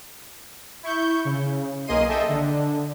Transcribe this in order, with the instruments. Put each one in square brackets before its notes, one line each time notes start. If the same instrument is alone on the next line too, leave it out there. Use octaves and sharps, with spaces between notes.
[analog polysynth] E4 C#6 G6
C#3
B1 A#3 G#4 D#5 C6 D#7
A4 D#5 E5 G5
D3